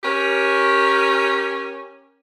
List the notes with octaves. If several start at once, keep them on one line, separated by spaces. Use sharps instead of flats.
C#4 G4 A#4